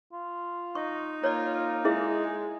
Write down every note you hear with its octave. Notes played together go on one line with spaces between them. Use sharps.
F4
D#4 C#6
A#3 F4 C#5 D5
G#3 E4 G#4 E5